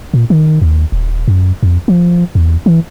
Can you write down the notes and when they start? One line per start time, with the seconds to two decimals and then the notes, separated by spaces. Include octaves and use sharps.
0.14 A#2
0.30 D#3
0.62 D#2
0.92 D#1
1.28 F#2
1.63 F2
1.88 F3
2.35 E2
2.66 E3